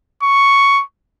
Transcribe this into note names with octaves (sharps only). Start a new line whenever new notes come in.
C#6